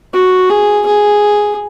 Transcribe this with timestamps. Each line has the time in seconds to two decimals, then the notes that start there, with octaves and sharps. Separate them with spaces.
0.13 F#4
0.50 G#4
0.86 G#4